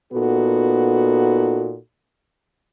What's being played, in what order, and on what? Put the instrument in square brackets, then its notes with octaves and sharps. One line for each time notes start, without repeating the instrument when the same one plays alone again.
[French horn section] A#2 B3 D#4 F#4 A4